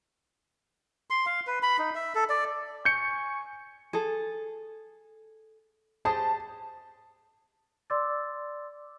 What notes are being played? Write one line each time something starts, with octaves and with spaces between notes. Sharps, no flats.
C6
F5
B4
B5
D#4
E5
A4
D5
G#5 C#6 G6 C#7
G#4 A4
G4 G#4 C5 A5
D5 C6 D6 E6 A6